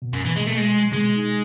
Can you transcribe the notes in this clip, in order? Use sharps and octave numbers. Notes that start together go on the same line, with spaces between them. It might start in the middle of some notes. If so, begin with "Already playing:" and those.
B2
F#2
B2 E3
G#3
B2 A3
G#3
B2
B2 G#3
D#4